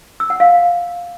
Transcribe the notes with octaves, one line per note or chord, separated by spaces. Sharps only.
E6
F#5
F5